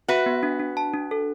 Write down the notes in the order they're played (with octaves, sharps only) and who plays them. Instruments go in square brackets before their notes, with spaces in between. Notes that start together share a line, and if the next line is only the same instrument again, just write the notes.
[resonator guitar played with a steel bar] F#4 B4 [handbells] E5
[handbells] B3
D4
D4
A5
D4
A4